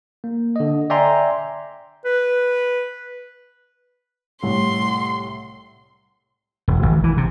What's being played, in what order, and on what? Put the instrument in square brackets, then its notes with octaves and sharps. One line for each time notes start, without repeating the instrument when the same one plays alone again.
[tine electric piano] A#3
D3 D#5
D5 E5 G5 G#5 A#5 C6
[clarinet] B4
[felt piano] C2 A2 [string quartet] C6
[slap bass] E1
G#1
E3
C3